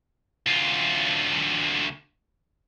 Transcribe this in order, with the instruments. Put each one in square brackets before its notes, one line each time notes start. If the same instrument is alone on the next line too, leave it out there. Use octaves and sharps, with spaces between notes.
[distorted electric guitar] D2 F4